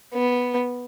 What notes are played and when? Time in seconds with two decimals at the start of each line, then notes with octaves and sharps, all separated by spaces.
0.14 B3